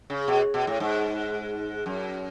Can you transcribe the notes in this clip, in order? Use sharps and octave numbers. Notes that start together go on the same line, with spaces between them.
C#3
B2
B2
A2
G#2
F#2